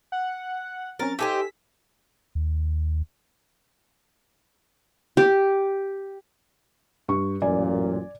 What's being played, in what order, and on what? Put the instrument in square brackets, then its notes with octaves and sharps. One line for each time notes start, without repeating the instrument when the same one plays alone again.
[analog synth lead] F#5
[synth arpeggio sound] F#3 C4 C#4 [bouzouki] A#4 [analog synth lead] A6
[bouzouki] D#4 G4 C5 [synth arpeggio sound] A4 G#5 E6 [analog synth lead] B6
[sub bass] D#2
[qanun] G4
[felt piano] G2 C#6
[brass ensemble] A1 F#2 A#2 [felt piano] D5 G#5